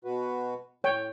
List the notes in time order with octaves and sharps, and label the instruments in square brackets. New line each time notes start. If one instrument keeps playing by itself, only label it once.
[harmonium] B2 F#4 B4
[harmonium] A2 [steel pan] C#5 G5